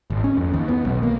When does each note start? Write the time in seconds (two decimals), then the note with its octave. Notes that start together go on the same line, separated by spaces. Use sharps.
0.10 G#1
0.24 C#4
0.37 F2
0.53 D#2
0.69 B3
0.85 B1
1.03 A#3